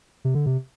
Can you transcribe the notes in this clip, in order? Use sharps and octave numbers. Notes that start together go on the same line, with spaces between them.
C3
D3
C3